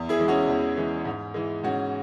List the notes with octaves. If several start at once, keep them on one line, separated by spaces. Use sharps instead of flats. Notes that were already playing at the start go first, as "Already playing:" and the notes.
Already playing: E2
E4 G#4
E3 G#3
C#4 F#4
E2
E3 G#3
G#2
E3 G#3
G#2 C#4 F#4